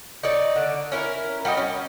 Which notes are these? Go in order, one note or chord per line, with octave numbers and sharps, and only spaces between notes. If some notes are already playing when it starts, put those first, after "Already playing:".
D#4 C#5 D5
D3
C#4 E4 A#4
G3 F#4 A4 D#5
C#4